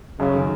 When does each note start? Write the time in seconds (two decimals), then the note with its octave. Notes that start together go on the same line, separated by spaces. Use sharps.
0.20 F#2 C#3
0.35 D#3